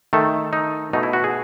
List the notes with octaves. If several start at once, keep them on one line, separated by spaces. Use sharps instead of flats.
D#3 A3 A4
D#4
B2 A3 D#4
E4
F#4
G#4